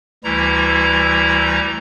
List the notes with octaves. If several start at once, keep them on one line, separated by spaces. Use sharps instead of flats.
D2 E3 G3 E4 A#5